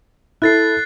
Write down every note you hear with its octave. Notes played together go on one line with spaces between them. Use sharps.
E4 A4 F#6 A6 C7